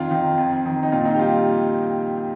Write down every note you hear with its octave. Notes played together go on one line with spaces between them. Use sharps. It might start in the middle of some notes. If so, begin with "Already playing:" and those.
Already playing: F2 D#3 F4
D#3
F2
D#3
D#4
A#2 F4
D#4
G4
G3 F4